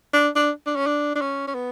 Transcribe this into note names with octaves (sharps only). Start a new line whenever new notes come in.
D4
D4
D4
C#4
D4
D4
C#4
C#4
B3